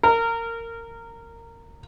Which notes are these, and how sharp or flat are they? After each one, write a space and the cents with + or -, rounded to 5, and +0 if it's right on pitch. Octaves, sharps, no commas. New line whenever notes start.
A#4 -20